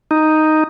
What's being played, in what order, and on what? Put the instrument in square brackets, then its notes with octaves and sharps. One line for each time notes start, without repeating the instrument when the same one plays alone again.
[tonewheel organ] D#4